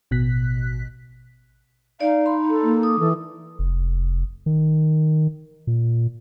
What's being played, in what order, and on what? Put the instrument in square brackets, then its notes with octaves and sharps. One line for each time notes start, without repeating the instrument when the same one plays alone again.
[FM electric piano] A1 B2 F#6 B6
[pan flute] D#4 [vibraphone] D5 [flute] F5
[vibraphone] B5 C6
[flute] A4
[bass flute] A#3
[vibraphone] D6 D#6
[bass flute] E3 [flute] A4
[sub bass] F1
D#3
A#2